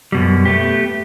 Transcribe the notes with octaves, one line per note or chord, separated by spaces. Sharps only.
F#2 B2 G3
A3 B3 G4